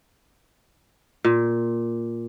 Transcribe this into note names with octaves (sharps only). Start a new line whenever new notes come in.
A#2